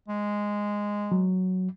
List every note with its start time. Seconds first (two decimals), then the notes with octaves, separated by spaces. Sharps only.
0.08 G#3
1.12 F#3